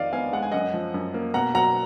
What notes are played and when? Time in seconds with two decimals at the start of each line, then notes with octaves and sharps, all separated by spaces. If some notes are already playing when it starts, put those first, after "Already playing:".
Already playing: F2 D#3 D5 D#5 F5
0.13 B3 F5 G#5
0.33 G#3 F#5
0.43 G#5
0.52 F#2 D#5 F#5
0.74 F3
0.94 F#2
1.14 A#3
1.34 B2 F#5 A#5
1.55 F#3 F#5 A#5